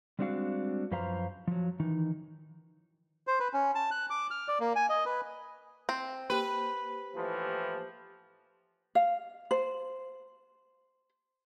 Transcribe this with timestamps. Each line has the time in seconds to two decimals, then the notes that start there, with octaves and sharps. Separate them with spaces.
0.19 G3 G#3 C4 D4 F#4 F5
0.91 F#2 F3 B4 C5 F5 A#5
1.48 F3 F#3
1.80 D#3 E3 D#4
3.27 C5
3.40 B4
3.53 C#4
3.75 A5
3.91 F#6
4.10 D6
4.31 F6
4.48 D5
4.60 A#3
4.76 G#5
4.89 D#5
5.06 B4
5.89 C4
6.30 A#3 G4 B4 C5
7.15 A2 E3 F3
8.95 F5
9.51 C5